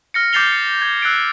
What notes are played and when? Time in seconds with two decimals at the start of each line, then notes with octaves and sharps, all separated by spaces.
0.14 F6 A#6 C#7
0.33 D6 G6 A6 C7 F7 G7
0.52 C#7
0.82 G6 G#6
1.02 E6 F#6 A6 C7 D7